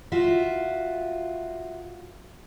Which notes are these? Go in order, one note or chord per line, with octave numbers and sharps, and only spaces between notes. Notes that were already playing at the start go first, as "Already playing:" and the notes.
F4 F#4 E5